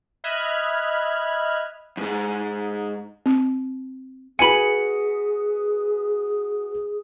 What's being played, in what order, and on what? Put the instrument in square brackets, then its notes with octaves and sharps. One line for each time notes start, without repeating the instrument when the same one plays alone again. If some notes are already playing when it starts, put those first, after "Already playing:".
[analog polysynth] D#5 E5 B5 F6 F#6 G#6
[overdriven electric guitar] F2 G#2
[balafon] C4
[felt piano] F#4 B4 C#7 [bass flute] G#4 [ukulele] G#5 B5